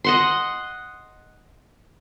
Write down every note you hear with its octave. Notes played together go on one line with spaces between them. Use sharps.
D#5 F#5 C6